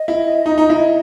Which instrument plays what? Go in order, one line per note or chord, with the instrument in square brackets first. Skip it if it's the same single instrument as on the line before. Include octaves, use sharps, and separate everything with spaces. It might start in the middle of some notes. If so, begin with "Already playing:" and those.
Already playing: [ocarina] D#5
[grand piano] E4
D#4
D#4
E4